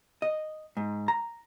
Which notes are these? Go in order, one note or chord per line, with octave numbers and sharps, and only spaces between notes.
D#5
G#2
A#5